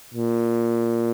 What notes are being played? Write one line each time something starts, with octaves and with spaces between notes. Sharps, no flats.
A#2